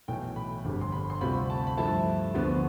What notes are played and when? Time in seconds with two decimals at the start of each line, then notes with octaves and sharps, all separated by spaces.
0.08 B1 A2 E3 G5
0.36 B5
0.64 G1 F2 D3 G3
0.81 C6
0.92 B5
1.10 C6
1.21 D2 C3 G3 C4 F4 B5
1.50 A5
1.67 B5
1.77 G2 F3 A3 E4 A5
2.35 D2 D3 F3 B3